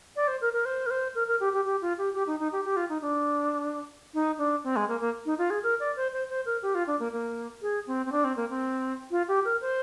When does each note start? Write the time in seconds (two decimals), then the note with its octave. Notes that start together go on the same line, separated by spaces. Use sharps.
0.16 D5
0.28 C5
0.41 A#4
0.53 A#4
0.65 C5
0.86 A#4
0.90 C5
1.15 A#4
1.27 A#4
1.40 G4
1.53 G4
1.65 G4
1.82 F4
1.98 G4
2.15 G4
2.27 D#4
2.40 D#4
2.52 G4
2.65 G4
2.76 F4
2.89 D#4
3.02 D4
4.14 D#4
4.38 D4
4.64 C4
4.76 G#3
4.89 A#3
5.00 A#3
5.26 D#4
5.38 F4
5.50 G#4
5.63 A#4
5.80 D5
5.96 C5
6.12 C5
6.29 C5
6.46 A#4
6.62 G4
6.75 F4
6.87 D4
7.00 A#3
7.12 A#3
7.62 G#4
7.87 C4
8.06 C4
8.12 D4
8.24 C4
8.36 A#3
8.50 C4
9.11 F4
9.28 G4
9.45 A#4
9.61 C5